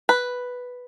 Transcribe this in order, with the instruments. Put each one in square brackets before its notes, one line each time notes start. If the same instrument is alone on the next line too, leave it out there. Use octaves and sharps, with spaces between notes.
[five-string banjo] B4